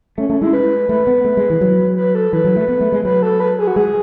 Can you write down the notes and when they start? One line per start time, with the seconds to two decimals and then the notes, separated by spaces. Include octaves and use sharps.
0.17 A3 C#4
0.29 A3 C#4
0.41 G#3 E4
0.53 B4
0.89 A3 B4
1.07 B3
1.25 A3
1.37 G#3
1.50 E3
1.61 F#3
1.97 B4
2.15 A4
2.33 E3 B4
2.45 F#3
2.56 A3
2.69 B3
2.81 A3
2.92 G#3
3.04 F#3 B4
3.22 A4
3.40 B4
3.59 G#4
3.67 F#4
3.76 G#3 G#4